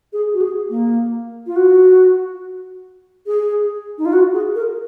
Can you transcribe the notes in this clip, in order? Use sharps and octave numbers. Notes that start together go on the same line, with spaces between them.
G#4
F#4
G#4
A#3
F4
F#4
G#4
D#4
F4
F#4
G#4
A#4